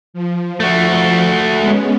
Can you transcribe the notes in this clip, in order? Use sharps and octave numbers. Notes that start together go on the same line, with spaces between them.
F3
A3 F#4
G#3 B3 C#4